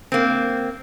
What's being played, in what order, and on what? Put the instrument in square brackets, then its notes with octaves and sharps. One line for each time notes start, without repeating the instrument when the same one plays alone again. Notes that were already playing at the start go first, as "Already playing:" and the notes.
[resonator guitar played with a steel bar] A#3 C4